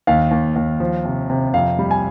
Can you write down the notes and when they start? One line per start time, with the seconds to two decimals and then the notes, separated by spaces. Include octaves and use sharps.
0.07 D#2 F5
0.31 D#2
0.56 D#2
0.80 F3
1.05 C3
1.30 C3
1.54 F2 F5
1.79 G3
1.91 G#5